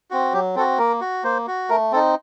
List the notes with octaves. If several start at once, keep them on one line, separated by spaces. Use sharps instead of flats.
C4 F#4
F#3 G4
C4 F#4 A4
A#3 A#4
F#4
A#3 C5
F#4
A3 A#4
C4 D#4 A4